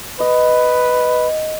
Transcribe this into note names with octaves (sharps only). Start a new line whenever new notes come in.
B4 D#5